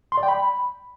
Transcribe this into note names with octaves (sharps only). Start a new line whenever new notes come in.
C6
D5
G5
B5